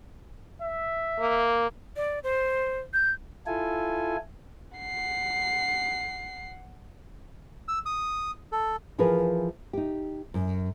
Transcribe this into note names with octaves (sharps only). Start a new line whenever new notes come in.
E5
A#3
D5
C5
G6
E4 F4 A4 G#5
F#5 C7
E6
D#6
A4
E3 F3 G#4 A#4 B4
D#4 G4
F#2